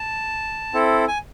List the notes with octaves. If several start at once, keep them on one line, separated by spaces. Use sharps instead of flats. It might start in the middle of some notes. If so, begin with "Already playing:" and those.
Already playing: A5
C4 E4 A4
G#5